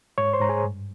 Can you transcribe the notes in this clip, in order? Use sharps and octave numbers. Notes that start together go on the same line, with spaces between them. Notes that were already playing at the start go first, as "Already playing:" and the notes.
G#2 C#5 C#6
C5 C6
G#2 A#5
G#4 G#5
G2